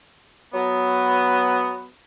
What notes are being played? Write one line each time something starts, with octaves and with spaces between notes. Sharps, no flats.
F#3 B3